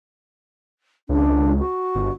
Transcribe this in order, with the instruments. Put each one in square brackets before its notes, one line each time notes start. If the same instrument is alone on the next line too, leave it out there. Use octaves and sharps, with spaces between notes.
[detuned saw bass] C#2 [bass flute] D4
[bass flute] F#4
[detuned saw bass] G1